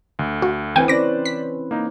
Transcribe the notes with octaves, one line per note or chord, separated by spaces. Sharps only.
D2
F#4
E3 C4 B4 G5 G#5
C#4 B4 C5 D5 D6 A#6
B6
A#3 D#4